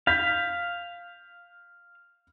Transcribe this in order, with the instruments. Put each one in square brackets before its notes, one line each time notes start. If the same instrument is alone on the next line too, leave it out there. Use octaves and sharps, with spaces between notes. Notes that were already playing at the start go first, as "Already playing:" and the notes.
[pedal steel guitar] F5 [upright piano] G6 B6